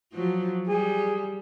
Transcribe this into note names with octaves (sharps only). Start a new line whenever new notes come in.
F3 F#3
G3 G#4